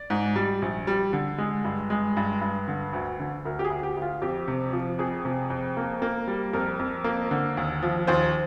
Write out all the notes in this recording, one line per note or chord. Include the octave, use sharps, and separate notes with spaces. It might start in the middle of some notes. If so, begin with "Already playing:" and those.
Already playing: D5
G#2
G3
A#1
G3
D3
G#3
G2
G#3
G2
G2
D3
D2
D3
D2 A#4
G4
G#4
D2
G4
D2
F4
F2 G4
C3
F3
F2 G#4
C3
F2
A#3
A#3
G3
F2 A#4
F2
A#3
D3
D#2
F3
D#2 C5